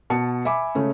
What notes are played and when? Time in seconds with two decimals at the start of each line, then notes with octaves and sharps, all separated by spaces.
0.10 B2 A5 C#7
0.45 E5 G#5 B5 D6
0.75 C#3 G#3 A3 C#4